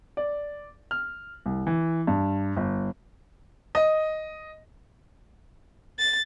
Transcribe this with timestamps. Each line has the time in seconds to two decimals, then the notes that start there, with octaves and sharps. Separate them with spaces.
0.17 D5
0.91 F6
1.46 C2
1.67 E3
2.07 G2
2.57 G1
3.75 D#5
5.99 A6